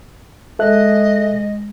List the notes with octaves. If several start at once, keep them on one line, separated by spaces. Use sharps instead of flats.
G#3 G#4 A4 D#5 E5 F#6